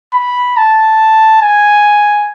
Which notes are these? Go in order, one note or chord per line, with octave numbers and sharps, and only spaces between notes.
B5
A5
G#5